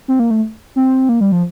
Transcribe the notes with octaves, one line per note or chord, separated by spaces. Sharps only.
C4
A#3
A3
C4
A#3
G3
F3